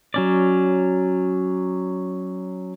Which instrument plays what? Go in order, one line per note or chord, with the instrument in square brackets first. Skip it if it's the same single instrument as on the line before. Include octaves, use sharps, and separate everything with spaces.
[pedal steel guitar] F#3 C#4 D5